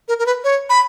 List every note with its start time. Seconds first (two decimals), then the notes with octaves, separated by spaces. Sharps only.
0.08 A#4
0.19 A#4
0.26 B4
0.44 C#5
0.70 B5